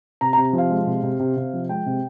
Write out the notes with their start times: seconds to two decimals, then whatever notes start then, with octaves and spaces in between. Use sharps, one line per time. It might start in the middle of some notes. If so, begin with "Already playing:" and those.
0.21 C3 A#5
0.33 C3 A#5
0.53 F3
0.58 F5
0.70 G#3
0.87 C3
1.03 C3
1.20 C3
1.37 C3
1.54 F3
1.69 G#3 G5
1.86 C3